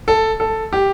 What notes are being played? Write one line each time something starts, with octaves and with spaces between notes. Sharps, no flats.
A4
A4
G4